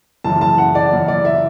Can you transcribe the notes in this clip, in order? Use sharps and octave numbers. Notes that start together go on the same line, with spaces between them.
F#1 F#2 E3 A5
A5
F#5
D5
F#1 F#2 E3
D5
E5